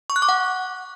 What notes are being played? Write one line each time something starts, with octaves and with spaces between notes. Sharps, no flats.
C#6
F#6
D6
F#5